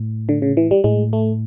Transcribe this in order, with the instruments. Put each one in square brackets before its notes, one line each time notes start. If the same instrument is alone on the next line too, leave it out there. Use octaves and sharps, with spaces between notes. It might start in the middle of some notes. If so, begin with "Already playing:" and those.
Already playing: [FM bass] A2
[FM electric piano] D3
C#3
E3
G3
[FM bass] A2 [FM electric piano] G#3
[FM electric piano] A3